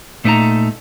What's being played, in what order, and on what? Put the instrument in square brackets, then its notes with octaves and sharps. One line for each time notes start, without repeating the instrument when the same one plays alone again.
[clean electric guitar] A#2 A3 B3 D#4 A5 A#5